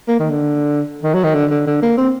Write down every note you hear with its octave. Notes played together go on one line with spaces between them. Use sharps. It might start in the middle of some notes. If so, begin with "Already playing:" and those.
A#3
D#3
D3
D#3
F#3
D#3
D3
D3
D3
A#3
C4